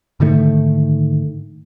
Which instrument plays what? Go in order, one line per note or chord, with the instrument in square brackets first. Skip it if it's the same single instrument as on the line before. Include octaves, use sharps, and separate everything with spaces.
[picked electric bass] G#2 D3 D#3 A3